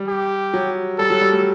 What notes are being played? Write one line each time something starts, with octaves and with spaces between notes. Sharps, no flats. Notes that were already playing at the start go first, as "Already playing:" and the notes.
Already playing: G3
G4
F#3
G3 A4
F#3
G3
A3